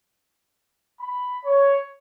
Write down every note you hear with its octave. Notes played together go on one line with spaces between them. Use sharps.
B5
C#5